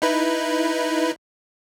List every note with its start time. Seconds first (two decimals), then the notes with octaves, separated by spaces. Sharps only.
0.02 D#4 E4 B4